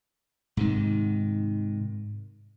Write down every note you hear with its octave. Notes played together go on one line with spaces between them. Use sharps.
G#2 C3 D#3